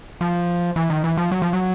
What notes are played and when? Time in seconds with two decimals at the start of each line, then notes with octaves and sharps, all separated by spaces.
0.21 F3
0.76 E3
0.90 D#3
1.04 E3
1.17 F3
1.31 F#3
1.42 F3
1.53 F#3